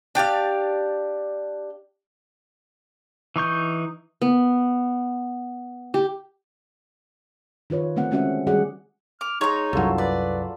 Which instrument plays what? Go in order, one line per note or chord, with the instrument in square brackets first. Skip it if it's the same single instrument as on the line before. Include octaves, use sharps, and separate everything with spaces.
[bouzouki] D4 G4 D5 F5
[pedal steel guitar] E3 D#4 C#6 G6
[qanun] B3
G4
[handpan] D#3 F4 B4 C#5
D3 A3 C4 F#5
G#3 C4 C#4 F#4 E5 F#5
D#3 G3 F#4 G#4 D5 F#5
[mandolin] D6 [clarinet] F6
[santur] G#3 [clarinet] D#4 [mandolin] C#5 A#5
[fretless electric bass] C2 F#2 [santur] F#3 F4 A4
[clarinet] B4 [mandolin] D5 [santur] B5